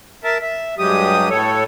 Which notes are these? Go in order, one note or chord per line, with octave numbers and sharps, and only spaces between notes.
A#4 E5 A5
E5
G2 F#3 G#3 G4 D#6
A2 A4 C#5